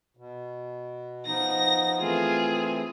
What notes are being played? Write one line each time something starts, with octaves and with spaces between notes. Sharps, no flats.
B2
F3 B3 D#4 A#6
E3 A3 C4 F4 G#4